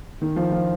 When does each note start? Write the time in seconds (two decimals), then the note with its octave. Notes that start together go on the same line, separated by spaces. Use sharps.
0.22 D#3
0.36 F3
0.52 F3